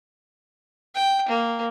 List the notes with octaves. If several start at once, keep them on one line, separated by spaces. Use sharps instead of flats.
G5
A#3